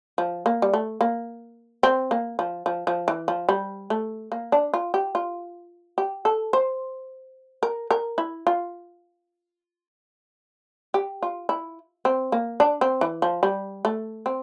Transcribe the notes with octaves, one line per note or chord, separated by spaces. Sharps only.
F3
A#3
G3
A3
A#3
C4
A#3
F3
F3
F3
E3
F3
G3
A3
A#3
D4
F4
G4
F4
G4
A4
C5
A#4
A#4
E4
F4
G4
F4
E4
C4
A#3
D4
C4
E3
F3
G3
A3
C4